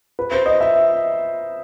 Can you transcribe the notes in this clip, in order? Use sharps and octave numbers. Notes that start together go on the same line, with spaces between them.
B4
C5
D#5
E5